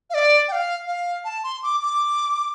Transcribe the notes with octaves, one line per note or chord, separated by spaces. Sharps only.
F5
D5
G5
F5
F5
A5
C6
D6
D6